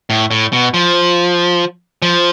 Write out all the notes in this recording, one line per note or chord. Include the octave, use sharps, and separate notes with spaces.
A2
A2
B2
F3
F3